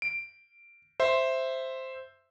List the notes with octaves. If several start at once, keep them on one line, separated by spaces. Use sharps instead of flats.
D7
C5 E5 C6